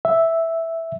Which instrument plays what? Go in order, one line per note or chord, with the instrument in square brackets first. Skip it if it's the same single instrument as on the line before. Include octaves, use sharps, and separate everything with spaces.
[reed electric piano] E5